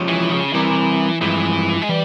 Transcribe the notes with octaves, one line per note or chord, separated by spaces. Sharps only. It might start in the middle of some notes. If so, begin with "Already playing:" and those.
Already playing: F3 G#3 C#4 G4
E3
C#3
E3 G3 C4 G4 A#4
G2 E3 F3 G#3 C4 G4
G#3
E3 G3